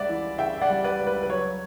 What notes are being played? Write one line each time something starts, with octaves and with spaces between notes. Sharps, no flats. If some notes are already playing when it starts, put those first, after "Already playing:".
Already playing: C#2 G3 D5 E5 F#5
E3
C#3 E5 G5
E5
D5 F#5
G3
B4 D5
C#2
B4
B4
F#3 C#5